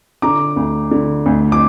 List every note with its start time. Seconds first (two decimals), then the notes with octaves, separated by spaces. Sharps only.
0.22 D3 A#5 D6
0.56 D2
0.91 D3
1.26 D2
1.52 D6